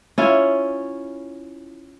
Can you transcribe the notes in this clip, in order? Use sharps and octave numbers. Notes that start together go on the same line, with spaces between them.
C#4 E4 F4